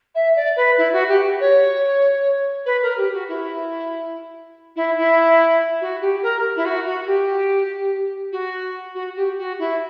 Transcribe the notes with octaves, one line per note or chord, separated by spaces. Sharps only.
E5
D5
B4
E4
F#4
G4
C#5
B4
A#4
G4
F#4
E4
E4
E4
F#4
G4
A#4
E4
F#4
F#4
G4
F#4
F#4
G4
F#4
E4